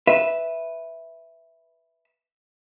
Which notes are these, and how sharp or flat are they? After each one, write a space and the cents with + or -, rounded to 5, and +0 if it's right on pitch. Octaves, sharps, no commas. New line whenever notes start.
B4 +0 E5 +0